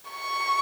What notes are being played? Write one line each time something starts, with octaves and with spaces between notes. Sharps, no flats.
C#6